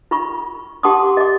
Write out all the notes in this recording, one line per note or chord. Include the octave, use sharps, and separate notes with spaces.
F4 B5 C#6
G4 F#5 A5 C6 D6 D#6
D#5 D6